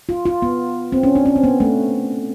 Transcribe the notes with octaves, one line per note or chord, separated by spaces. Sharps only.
F4
F4
B3
C4
C#4
D4
C#4
C4
B3
A3